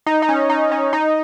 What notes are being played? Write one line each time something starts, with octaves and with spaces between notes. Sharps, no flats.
D#4
D#4
C#4
D#4
C#4
D#4